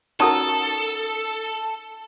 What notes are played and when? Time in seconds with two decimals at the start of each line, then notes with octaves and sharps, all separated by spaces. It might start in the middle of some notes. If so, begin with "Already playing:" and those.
0.20 C#4 D#4 F#4 A4 A#4 A5 D#6